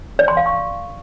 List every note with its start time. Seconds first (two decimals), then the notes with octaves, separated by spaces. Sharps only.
0.19 D5
0.28 C6
0.37 F5
0.46 C#6